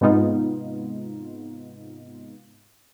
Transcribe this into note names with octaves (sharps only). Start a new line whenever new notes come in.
G#2 C3 G#3 B3 D#4 F4